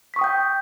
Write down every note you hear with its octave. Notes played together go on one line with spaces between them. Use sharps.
G5 C#6 D#6 G6 B6